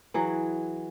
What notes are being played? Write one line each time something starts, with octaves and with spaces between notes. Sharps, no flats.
E3 F#3 G#4